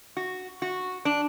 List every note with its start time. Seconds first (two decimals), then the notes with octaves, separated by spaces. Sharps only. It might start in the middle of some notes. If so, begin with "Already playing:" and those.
0.17 F#4
0.62 F#4
1.05 D4